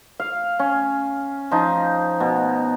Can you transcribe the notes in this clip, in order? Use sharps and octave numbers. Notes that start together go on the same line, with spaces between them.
F5
C#4
F3 D#4
B2